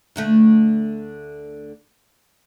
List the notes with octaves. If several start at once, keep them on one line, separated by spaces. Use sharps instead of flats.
D2 D3 A3